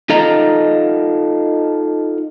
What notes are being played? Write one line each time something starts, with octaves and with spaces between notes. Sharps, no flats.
D#4 F4 A4 D#5 A#5